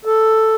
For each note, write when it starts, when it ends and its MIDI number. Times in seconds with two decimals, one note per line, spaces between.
0.05 0.56 69